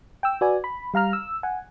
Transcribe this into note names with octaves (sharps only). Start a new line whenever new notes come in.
G5 E6
F#4 B4 D5 G#5
B5
G3 F5 A#5 F6
E6
F#5 G#5